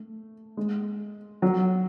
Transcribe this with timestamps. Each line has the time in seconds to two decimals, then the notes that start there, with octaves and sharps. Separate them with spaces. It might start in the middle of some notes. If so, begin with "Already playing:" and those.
Already playing: A3
0.57 G#3
1.42 F#3